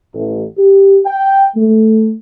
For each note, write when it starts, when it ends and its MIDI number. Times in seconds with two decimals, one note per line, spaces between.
0.13 0.43 33
0.58 0.99 67
1.05 1.43 79
1.56 2.13 57